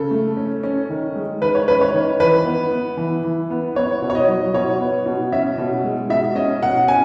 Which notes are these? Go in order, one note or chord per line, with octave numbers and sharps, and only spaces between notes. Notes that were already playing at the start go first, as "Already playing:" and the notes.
Already playing: C#3 A4
A3
C#4
C#4
D#3
G#3
D#3 B4
C#5
C#4 B4
C#5
D#3
E3 B4
B3
B3
E3
E3
B3
B3 C#5
B2
C#5
D#5
F#3
B2 C#5
B3
B2
C#4 E5
B2
G#3
B2 E5
C#4 D#5
B2 F#5
C#4 G#5